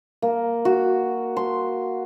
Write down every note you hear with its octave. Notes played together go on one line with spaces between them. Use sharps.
A#3
F#4
C6